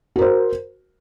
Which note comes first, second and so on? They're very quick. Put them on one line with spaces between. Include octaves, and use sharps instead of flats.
F#4 A#4 C5